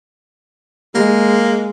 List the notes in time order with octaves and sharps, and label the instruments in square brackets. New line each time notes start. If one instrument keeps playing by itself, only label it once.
[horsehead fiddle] G#3 [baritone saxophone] A#3